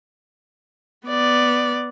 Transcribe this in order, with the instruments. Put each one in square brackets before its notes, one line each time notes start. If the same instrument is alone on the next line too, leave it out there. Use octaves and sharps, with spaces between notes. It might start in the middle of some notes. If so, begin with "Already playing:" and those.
[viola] B3 D5